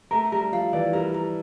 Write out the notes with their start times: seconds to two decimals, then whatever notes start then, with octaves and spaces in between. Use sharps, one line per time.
0.11 A3 A#4
0.32 G3 A#4
0.52 F3 F5
0.73 E3 D5
0.93 G3 A#4
1.14 A#4